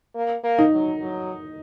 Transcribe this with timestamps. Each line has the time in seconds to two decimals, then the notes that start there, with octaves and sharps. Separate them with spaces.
0.15 A#3
0.44 A#3
0.59 D#4
0.73 F#3
1.01 F#3